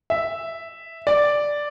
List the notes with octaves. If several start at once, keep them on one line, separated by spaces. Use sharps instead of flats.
E5
D5